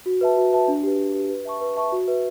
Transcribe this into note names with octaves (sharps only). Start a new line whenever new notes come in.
F#4
B4 E5 A5
F#4
B4 E5 A5
D4
G4 B4
D4
G4 B4
B4
E5 A5 C#6
B4
E5 A5 C#6
F#4
B4 E5